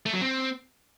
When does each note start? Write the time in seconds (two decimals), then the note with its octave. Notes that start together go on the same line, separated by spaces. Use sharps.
0.06 A3
0.13 F#3
0.21 C4